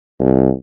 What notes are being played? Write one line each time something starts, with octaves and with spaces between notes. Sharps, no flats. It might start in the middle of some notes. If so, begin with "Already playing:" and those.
C2